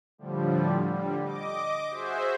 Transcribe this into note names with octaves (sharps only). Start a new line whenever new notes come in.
A2 D3 F3 G3
D3 G3
D#5 D6
F#4 G#4 C5 E5